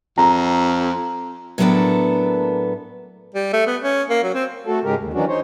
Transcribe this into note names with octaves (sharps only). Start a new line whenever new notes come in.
F2 A#5
A2 F#3 A#3 B3 D4 A4
G3
A3
B3
C#4
A#3
F#3
C4
A3 F#4 A4
G#2 C#3 G#3 G4 A#4
D#2
D#3 E3 F#3 C#4 D4 F#4
D#4 C5 C#5